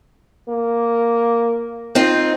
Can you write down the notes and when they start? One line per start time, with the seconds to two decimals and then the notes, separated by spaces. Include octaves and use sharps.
0.49 A#3
1.95 C4 D#4 F4